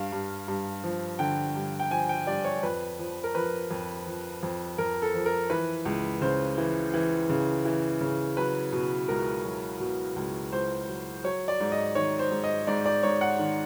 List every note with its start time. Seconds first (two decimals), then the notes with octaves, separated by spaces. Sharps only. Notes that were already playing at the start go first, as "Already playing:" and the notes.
Already playing: G2 F5
0.12 G2
0.48 G2
0.84 F3
1.19 D3 G5
1.56 G2
1.79 G5
1.91 F3 G#5
2.09 G5
2.27 G2 D5
2.45 C#5
2.63 F2 B4
2.99 F3
3.24 A#4
3.35 F3 B4
3.71 F2
4.07 F3
4.43 F2
4.78 F2 A#4
5.02 A4
5.14 F3
5.26 A#4
5.50 E3 B4
5.85 C#2
6.21 C#3 C5
6.58 E3
6.94 E3
7.29 C#3
7.65 E3
8.01 C#3
8.37 F#3 B4
8.72 B2
9.08 C#2 A#4
9.45 F#3
9.80 B2
10.16 C#2
10.52 C#2 C5
10.88 F#3
11.24 F#3 C#5
11.48 D5
11.60 G#2
11.72 D#5
11.95 D#3 C#5
12.19 C5
12.31 G#2
12.44 D#5
12.67 G#2 D5
12.86 D5
13.03 G#2 C#5
13.21 F#5
13.39 D#3